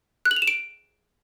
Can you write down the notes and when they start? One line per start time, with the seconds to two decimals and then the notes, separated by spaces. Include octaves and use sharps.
0.25 F#6
0.31 F#7
0.36 F7
0.42 E7
0.48 D7